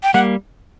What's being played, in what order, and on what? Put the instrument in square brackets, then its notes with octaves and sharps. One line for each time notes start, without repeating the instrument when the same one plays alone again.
[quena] G5
[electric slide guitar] G3 A#3 [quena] F#5